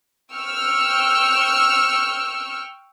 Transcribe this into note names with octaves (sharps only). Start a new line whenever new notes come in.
G5 C#6 E6 F6